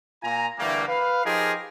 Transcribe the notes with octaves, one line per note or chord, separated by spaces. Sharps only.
A#2 F4 G#5 A#5
D3 E3 G3 A3 A#3
B4 F5
F3 D#4 F4 G4 G#4 A#4